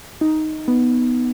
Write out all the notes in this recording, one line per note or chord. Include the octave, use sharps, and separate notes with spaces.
D#4
B3